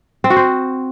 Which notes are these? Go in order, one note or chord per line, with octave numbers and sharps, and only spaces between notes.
C4
F#4
C5